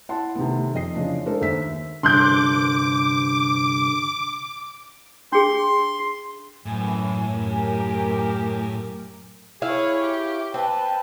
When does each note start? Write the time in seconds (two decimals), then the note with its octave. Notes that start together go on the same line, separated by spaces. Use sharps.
0.09 E4 F#5 A5 C6
0.35 C3 D#3 A3 B3
0.74 F2 D#5 C7
0.95 C#3 E3 F3 D4
1.26 G#3 D4 A4 A#4 C5
1.41 D#2 E5 E6 B6
2.03 C2 G2 D3 C6 D6 F#6 G6
5.32 D4 G#4 C6
6.66 F#2 A2 E3 G#5
7.29 F#2 G4 A#4
9.62 E4 G#4 C#5 F5
10.03 G4
10.54 C4 B4 A5